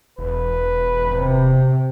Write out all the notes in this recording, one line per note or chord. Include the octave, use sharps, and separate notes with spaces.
E1 B4
C3